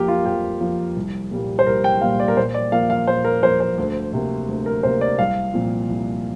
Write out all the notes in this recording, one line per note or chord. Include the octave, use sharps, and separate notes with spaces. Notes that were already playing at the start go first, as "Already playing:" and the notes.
Already playing: F2 F3 A#3 G4 A#4
F4
F2 G4
F3 A#3
C2
A#2 G3 A#3
C5
C2 A#4
G5
A#2 G3 A#3 F5
D5
A#4
A#2 C5
D5
F3 A#3 F5
F5
A#2 C5
A#4
F3 A#3 C5
C5
D2
C3 A#3
D2
A#4
C3 A#3 C5
D5
C2 F5
A#2 F3 C4
C2